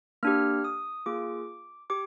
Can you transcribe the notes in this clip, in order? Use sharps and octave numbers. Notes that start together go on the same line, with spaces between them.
A#3 D4 G4 F6
D#6
A#3 F4 G#4 D6
G4 D6